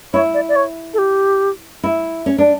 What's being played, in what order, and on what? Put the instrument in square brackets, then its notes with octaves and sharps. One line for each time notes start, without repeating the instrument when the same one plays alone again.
[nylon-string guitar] E4 [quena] C#5
[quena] D5
D5
C#5
A4
G4
[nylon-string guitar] E4
C#4
D4